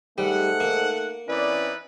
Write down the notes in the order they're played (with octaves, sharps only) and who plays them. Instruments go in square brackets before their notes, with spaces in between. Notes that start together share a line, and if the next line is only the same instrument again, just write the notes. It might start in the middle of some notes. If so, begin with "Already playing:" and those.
[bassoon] G#2 [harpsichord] G3 [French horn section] A3 D#4 A4 [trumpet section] F#5
[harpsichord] A#3
[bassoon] E3 [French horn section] C4 C#4 D5 [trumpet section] D#4 E4 B4